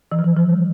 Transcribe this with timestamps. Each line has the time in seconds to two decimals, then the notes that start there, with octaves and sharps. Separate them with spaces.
0.12 E3
0.19 F3
0.24 E3
0.37 F3
0.49 G3